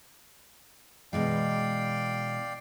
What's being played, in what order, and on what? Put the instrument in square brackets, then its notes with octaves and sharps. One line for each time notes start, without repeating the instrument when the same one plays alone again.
[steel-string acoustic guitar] B2 E3 G#3 [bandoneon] D5 F5 G5